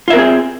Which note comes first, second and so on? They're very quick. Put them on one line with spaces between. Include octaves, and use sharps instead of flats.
F4 E5 A#4 C4 G#4